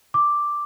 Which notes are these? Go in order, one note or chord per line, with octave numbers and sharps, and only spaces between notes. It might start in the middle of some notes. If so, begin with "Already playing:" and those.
D6